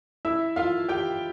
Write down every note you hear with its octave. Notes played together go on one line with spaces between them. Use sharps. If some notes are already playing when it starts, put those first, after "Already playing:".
E4 E5
F4 F5
G4 G5